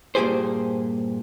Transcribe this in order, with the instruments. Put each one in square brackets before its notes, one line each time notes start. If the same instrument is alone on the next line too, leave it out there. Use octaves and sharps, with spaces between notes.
[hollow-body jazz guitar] G2 A#2 F#3 G4 G#4 C5